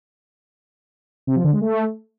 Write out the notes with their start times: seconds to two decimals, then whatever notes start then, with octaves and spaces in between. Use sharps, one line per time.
1.27 C3
1.36 F3
1.44 D3
1.53 G#3
1.61 A3